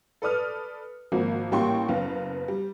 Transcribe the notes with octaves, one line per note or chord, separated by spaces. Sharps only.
A4 B4 D5 D#6 F6
G#1 F3 A#3 F#4
A1 G3 A#3 G5 C6 C#6
F#1 B3 F5
G3